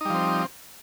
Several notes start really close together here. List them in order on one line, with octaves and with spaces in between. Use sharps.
D#4 G3 F3 C4